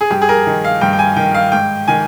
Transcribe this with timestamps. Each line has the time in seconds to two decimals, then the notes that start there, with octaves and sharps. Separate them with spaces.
0.01 G#4
0.11 G2 G4
0.22 G#4
0.29 A#4
0.47 D#3
0.64 F5
0.81 G2 G5
0.93 G5
0.99 G#5
1.16 D#3 G5
1.34 F5
1.52 G#2 G5
1.88 D#3 G#5